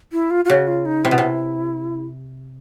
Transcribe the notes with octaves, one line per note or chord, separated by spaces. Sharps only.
E4
F4
F4
C#3 F#4
F4
D#4
C3 E4
B2
C3